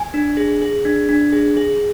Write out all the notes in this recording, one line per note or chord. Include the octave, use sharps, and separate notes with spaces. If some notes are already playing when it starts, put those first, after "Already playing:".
Already playing: G#5
D4
G#4
G#4
D4
D4
G#4
G#4